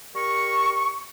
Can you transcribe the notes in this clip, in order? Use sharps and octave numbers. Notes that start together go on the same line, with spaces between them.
G3 A#4 C#6